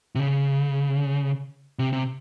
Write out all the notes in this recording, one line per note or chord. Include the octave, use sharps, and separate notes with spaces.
C3
C#3
C3
C3